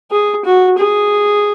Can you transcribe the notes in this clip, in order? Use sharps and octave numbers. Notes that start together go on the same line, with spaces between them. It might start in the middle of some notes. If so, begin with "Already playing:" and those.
G#4
F#4
G#4